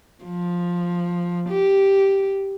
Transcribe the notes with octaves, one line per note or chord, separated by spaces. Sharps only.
F3
G4